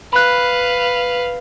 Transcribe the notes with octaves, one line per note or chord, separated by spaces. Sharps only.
B4 F5 B5 F#6